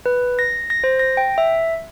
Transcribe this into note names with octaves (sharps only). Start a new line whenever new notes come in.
B4
A#6
A#6
C5
A#6
G5
E5